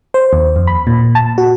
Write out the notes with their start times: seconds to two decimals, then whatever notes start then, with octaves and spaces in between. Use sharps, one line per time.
0.14 C5
0.33 D#2
0.56 F2
0.67 B5
0.87 A#2
1.15 A5
1.38 F#4